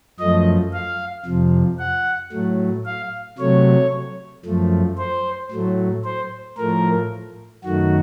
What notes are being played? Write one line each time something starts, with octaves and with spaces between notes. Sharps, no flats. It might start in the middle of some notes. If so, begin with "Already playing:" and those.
F#2 F3 A3 D#5
F5
F2 C3 F3
F#5
A2 F#3 A3
F5
C3 F#3 A3 C#5
F#2 F3 A3
C5
A2 F#3 A3
C5
A2 F3 A3 A#4
F#2 D#3 A3 F#4